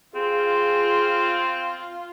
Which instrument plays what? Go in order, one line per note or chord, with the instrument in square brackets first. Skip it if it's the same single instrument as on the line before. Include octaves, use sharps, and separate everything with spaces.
[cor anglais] C4 [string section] F4 [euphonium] G#4